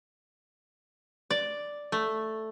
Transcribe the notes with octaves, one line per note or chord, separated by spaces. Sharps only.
D5
A3